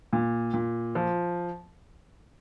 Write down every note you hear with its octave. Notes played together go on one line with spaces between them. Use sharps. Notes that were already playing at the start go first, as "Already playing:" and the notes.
A#2
A#2
F3